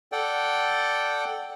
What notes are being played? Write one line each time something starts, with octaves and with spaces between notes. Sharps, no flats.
A4 D5 F#5 G5